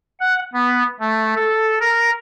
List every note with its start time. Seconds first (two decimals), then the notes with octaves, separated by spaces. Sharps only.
0.20 F#5
0.53 B3
1.00 A3
1.36 A4
1.80 A#4